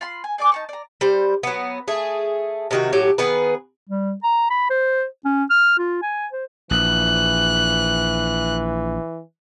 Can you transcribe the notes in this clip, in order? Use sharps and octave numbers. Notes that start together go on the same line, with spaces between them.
F4 B5 C6
G#5
G#4 D5 G#5 D6
D#4 A5 C#6
D5 A#5
G3 C5
F#3 B3
A3 G#4
C3 D#3 F#4
A2 F#3 G4
D#3 B3 G#4 B4
G3
A#5
B5
C5
C#4
F6
F4
G#5
C5
A#1 E3 F#6